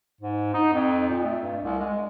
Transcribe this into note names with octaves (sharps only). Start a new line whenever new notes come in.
G#2
D#4
F2
A#2
A3
G2
C2
G#3